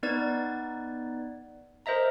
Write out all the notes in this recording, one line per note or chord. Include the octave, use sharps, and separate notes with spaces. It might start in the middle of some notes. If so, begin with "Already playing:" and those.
B3 D#4 B4 D5 G#6 A6
A#4 C5 D#5 E5 A#5